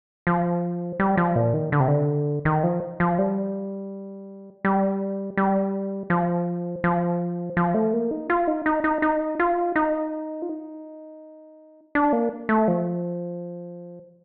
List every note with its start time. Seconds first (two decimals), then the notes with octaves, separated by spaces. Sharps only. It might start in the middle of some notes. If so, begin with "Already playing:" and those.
0.27 F3
1.00 G3
1.17 F3
1.36 A#2
1.54 D#3
1.72 D3
1.80 C3
1.88 D3
2.45 D#3
2.64 F3
3.00 F3
3.19 G3
4.65 G3
5.37 G3
6.10 F3
6.84 F3
7.57 F3
7.74 A3
7.93 A#3
8.11 D#4
8.30 F4
8.48 D#4
8.66 D#4
8.84 D#4
9.02 D#4
9.39 F4
9.76 D#4
10.42 F4
10.49 D#4
11.95 D4
12.13 A#3
12.49 A3
12.68 F3